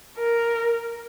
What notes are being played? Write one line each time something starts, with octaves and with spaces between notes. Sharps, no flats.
A#4